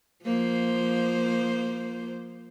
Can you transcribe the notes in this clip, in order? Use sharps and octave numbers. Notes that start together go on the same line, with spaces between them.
F3 A#3 C5